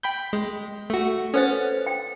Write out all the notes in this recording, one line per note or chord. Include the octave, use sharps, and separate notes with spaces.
G5 B5 G6
G#3
A3 F#4
C#4 A4 B4 C5 F#5 A6
G5